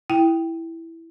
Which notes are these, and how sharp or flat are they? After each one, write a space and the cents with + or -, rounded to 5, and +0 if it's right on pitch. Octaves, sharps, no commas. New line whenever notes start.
E4 +0 G5 +0